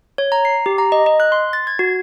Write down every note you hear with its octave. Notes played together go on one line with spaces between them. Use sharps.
C#5
A#5
C7
G4
A#5
D#5
D#5
F#6
C6
A6
G#6
F#4